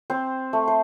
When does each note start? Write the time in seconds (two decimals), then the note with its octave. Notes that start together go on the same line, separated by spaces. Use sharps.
0.10 C4 C5
0.53 A3
0.68 C5